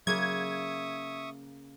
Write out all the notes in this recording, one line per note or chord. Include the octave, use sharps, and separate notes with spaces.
C#3 F#3 A#3 E5 C#6 D#6 G#6